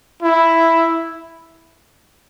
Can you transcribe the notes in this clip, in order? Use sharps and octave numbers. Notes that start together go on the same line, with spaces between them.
E4